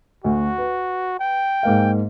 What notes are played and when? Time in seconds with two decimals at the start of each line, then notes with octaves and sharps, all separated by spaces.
0.24 D2 F#4
0.58 B4
1.19 G5
1.63 G#2 A#3 F5